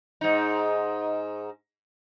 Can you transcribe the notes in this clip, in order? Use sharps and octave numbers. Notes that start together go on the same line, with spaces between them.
G#2 D#4